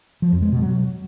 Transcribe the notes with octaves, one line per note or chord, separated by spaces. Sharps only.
F3
F2
G#3
B2
F#3